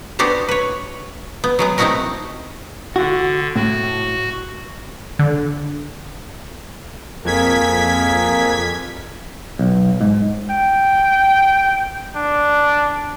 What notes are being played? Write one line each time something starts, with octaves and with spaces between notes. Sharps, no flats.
B3 D4 F#4 G4 A4 C5
B4 C#5
B3
F#3 G#3 B3
A3 C4 D#4 E4 F#4 A#4
D3 F#4
A2 F#4
D3
F2 A#3 G#4 A#4 G#6 B6
B1
G#2
G5
D4